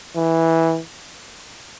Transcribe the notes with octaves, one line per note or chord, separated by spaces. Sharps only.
E3